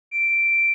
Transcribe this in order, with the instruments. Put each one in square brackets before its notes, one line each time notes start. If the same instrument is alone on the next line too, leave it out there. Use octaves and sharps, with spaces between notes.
[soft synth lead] D7